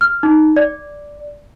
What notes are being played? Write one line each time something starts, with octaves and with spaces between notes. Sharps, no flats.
F6
D#4
D5